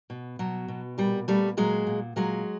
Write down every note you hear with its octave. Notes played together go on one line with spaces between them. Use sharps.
B2
B2 F#3
B2
A#2 G3
A#2 G3 A3
A#2 F#3 G#3
A#2
A#2 F#3 G#3